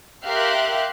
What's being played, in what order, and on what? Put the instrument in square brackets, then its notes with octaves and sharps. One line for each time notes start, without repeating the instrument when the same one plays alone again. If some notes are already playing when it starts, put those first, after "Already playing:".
[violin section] G4 A#4 E5 F5 C6 F#6